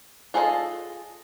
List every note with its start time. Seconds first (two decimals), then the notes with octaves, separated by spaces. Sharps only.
0.34 F4 G#4 A4 C#5 D#5